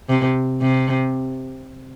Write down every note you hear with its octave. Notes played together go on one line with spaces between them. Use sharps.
C3
C3